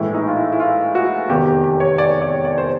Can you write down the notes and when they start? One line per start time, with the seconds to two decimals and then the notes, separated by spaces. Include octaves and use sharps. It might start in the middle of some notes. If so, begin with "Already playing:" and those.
Already playing: A#1 A2 E3 G#3 E4
0.14 D#4
0.28 F4
0.36 E4
0.52 E4
0.60 F4
0.95 F#4
1.28 F1 E2 C3 D#3 G4
1.46 G4
1.64 G4
1.80 C#5
1.98 D5
2.22 D5
2.45 D5
2.58 C5